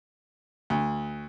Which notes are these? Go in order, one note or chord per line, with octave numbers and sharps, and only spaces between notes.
D2